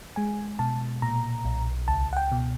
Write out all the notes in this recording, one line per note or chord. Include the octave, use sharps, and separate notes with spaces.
G#3 G#5
B2 A5
A#2 A#5
B1
C#2 A5
F#5
G5
B2